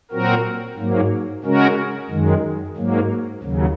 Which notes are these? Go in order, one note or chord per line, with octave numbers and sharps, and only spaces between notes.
A#2 F#3 C4 F#4 A#4
G#2 F#3 A#3
C#3 G#3 C#4 F#4 A#4
F#2 D#3 G#3
G#2 F#3 A#3
D#2 C#3 F#3